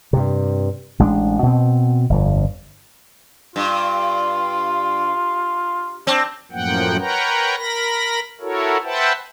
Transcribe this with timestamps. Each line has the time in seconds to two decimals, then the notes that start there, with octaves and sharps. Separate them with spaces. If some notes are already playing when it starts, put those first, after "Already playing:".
0.13 G2 C3
0.99 A1 G#3 A3 D4
1.43 B2 C4
2.10 G1 F2
3.56 G2 F4
6.07 C4 D4
6.52 F#2 A2 F3 A#3 F#5 G5
6.99 A#4 B4 C#5 F#5 G5 A#5
7.57 A#4 B5 A#6
8.41 E4 F#4 A4 A#4 C#5
8.84 B4 C5 E5 F#5 G5 A5